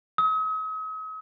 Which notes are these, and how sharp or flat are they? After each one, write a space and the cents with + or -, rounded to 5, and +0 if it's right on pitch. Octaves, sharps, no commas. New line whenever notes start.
D#6 +45